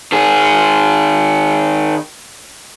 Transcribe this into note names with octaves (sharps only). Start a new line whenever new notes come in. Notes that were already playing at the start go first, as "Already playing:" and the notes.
D#3 G#4